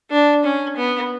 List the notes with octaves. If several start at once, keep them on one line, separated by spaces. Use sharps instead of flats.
D4
C#4
B3